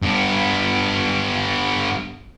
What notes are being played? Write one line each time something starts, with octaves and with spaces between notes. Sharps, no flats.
G2 B3